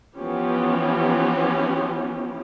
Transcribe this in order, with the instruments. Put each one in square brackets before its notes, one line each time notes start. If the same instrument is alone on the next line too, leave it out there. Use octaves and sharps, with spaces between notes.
[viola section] E3 F3 B3 C#4 G4